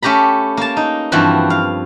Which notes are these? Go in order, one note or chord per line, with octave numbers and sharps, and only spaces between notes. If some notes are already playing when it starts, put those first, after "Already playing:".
A3 C#4 G4 A#5 B5
A#3 A5
D#4
G2 E3 F3 C4 F#4
F5